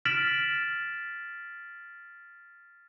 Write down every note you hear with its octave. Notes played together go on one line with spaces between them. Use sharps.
F6 A6 B6 D7 E7 F#7